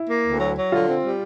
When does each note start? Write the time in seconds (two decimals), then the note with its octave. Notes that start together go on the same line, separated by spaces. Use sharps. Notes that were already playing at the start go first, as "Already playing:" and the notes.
Already playing: E4
0.09 A#3
0.25 D2
0.40 F#3
0.56 F#3
0.72 D3 F4
0.87 C4
1.02 G3